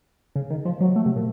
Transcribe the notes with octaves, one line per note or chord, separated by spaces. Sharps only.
C#3
D#3
F3
F#3
A3
C3
A#2